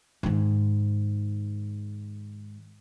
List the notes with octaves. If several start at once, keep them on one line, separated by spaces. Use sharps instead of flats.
G#2 D#3